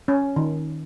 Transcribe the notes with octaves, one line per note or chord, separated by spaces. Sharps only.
C#4
D#3